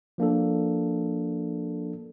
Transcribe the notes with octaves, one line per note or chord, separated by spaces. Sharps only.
F3 A#3 D4 A4